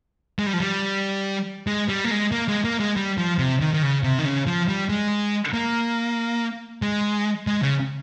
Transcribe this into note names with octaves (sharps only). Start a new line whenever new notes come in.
G#3
G3
F3
G3
G#3
G3
A#3
G#3
A#3
G#3
A#3
G#3
G3
F3
C3
D#3
D#3
C#3
C3
D#3
C#3
F3
G3
G#3
A#3
G#3
G#3
C#3